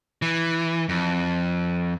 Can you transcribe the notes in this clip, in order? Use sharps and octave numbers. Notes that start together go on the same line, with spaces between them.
E3
F2